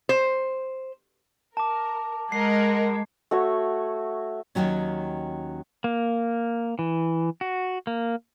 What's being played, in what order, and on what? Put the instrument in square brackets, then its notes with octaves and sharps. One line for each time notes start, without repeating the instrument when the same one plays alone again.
[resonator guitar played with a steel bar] C5
[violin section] A#4 [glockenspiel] A5 D6
[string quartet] G#3 [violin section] A#4 D#5 F#5 [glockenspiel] C7
[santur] A3 F#4 C#5
[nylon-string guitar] D#2 A#2 D#3 F#3 C#4
[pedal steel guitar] A#3
E3
F#4
A#3